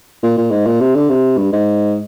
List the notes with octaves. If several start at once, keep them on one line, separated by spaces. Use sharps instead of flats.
A#2
A#2
G#2
A#2
C3
D3
C3
G2
G#2